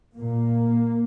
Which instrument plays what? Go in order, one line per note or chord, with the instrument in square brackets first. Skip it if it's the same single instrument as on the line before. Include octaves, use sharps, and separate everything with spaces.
[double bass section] A#2 A#3